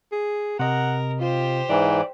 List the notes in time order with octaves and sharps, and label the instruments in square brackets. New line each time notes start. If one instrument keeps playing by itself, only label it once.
[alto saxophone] G#4
[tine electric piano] C3 D#5 [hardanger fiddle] A#4 [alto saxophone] F#5
[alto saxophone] F4 [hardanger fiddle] G4 C5
[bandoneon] G#2 E3 [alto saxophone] D5